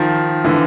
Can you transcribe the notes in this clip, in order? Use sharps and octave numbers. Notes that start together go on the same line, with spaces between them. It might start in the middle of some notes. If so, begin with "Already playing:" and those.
Already playing: D#3 F3
D3 E3